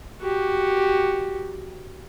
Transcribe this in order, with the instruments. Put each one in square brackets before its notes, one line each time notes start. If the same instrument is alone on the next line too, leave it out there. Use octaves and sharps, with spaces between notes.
[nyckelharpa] F#4 G4